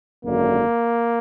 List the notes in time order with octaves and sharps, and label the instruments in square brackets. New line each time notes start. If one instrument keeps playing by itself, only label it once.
[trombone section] G#1 F#2 D3 A#3